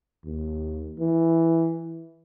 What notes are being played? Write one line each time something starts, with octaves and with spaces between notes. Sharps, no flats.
D#2
E3